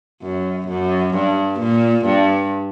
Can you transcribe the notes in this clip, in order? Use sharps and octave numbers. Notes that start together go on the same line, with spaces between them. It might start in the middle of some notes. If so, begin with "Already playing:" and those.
F#2
F#2
G2
A#2
G2